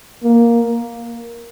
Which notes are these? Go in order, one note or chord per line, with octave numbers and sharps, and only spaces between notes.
A#3